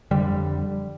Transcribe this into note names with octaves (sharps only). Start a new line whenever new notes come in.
F2 D3 G3